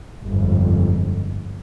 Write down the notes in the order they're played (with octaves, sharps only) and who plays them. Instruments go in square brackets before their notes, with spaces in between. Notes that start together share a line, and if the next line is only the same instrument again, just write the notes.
[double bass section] G1 F2 G#2